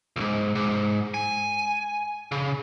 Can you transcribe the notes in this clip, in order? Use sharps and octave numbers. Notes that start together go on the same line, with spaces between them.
B1 G#2
G#2
G#5
C#3